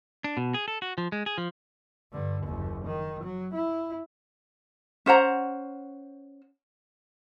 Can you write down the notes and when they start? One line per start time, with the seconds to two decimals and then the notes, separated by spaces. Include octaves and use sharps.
0.24 D4
0.37 B2
0.54 G#4
0.68 A4
0.82 F#4
0.98 F3
1.12 G#3
1.26 G#4
1.38 F3
2.12 G2 D3
2.43 F#1 D#2
2.85 D#3
3.23 F#3
3.54 E4
5.06 C#4 C5 F#5 A#5